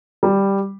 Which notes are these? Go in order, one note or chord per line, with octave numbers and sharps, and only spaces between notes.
G3